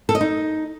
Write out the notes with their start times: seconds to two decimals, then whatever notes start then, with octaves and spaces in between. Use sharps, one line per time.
0.09 A4
0.15 D#5
0.21 D#4